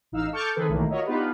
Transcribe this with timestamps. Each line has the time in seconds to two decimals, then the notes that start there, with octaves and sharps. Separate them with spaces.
0.12 A1 D#4 F5 E6
0.32 A4 C#6 D6 F6 G6 A6
0.55 D#3 C4 G#4 A4 B4
0.69 B1 A2 D#3 E3 A3 A#3
0.90 F4 F#4 A#4 C#5 D#5 E5
1.06 B3 D4 D#4 F4 G4 B4